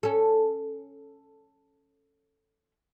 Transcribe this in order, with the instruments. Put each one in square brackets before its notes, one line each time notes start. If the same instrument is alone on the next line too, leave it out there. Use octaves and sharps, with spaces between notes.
[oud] C#4 A4